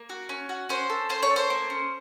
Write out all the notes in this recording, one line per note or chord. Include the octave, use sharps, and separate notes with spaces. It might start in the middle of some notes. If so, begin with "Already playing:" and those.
Already playing: A#3
F#4
C#4
F#4
C#4 C5
A4
C#4 C5
C#5
A4
C5
A#3
C#4